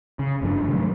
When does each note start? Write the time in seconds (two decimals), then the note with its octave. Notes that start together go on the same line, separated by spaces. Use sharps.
0.19 C#3
0.42 F#1 G2 F3 D4
0.68 C3 D#3 F#3 A3